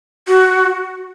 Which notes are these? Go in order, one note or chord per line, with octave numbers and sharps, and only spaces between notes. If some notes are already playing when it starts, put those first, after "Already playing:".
F#4